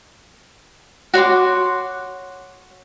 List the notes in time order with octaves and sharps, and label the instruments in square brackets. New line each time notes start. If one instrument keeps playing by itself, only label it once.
[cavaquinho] F#4 C#5 C6 D6